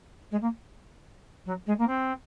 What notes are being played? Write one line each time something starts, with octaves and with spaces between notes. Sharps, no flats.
G#3
A#3
F#3
G#3
A#3
C4